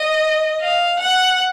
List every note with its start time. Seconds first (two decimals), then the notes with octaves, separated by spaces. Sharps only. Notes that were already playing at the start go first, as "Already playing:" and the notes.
Already playing: D#5
0.62 F5
1.00 F#5